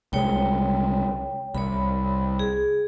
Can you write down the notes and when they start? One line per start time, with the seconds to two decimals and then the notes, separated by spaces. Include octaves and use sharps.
0.13 C2 G#3 C#5 G5
1.55 C2 C#5 B5
2.39 G#4